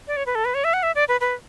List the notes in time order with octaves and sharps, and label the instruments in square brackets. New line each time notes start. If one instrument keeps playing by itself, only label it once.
[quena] D5
C#5
B4
A4
B4
C#5
E5
F#5
E5
D5
B4
B4